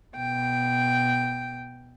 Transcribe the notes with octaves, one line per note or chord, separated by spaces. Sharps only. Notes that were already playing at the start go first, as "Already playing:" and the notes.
B2 G5